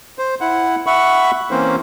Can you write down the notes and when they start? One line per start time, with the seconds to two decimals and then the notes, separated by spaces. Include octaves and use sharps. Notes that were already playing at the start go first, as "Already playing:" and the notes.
0.19 C5
0.41 E4 F#5
0.87 E5 F#5 B5 C#6
1.51 E3 A#3 C4 C#4 C5